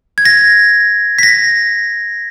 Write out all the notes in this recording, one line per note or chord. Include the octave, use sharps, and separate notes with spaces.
G#6
A#6
B6
A#6